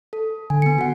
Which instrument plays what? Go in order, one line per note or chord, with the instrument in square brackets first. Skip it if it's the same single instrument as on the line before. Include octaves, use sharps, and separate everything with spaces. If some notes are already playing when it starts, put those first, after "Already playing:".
[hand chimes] A4
[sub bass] D3 [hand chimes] G#5
[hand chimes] B3 C#7
F#4 F#5